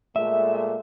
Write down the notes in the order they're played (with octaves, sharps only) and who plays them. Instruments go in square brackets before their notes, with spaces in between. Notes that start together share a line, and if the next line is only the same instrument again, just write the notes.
[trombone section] A#2 G#3 A3 [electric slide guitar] E5